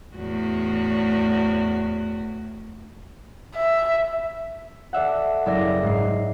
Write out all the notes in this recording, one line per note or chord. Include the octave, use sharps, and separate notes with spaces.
E2 A2 F#4
E5
A4 D5 E5 F#5
F#1 D5 E5 A#6
G#2 C7